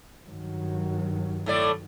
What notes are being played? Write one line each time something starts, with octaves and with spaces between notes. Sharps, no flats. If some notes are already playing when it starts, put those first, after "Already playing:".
G2 D#3 F#3
A2 A3 D5